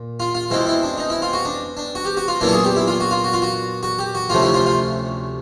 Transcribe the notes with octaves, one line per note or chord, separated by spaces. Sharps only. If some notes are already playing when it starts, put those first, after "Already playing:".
Already playing: A#2
F4
F4
B2 G#3 C4 E4
E4
D4
D#4
E4
F4
F#4
D4
D4
F#4
G4
F#4
F4
A#2 F#3 B3 D4 E4
A4
G#4
G4
E4
F4
F#4
F4
F#4
F4
F#4
F#4
G4
F#4
D2 C3 F3 A3 C#4 F4
E4
F4
F4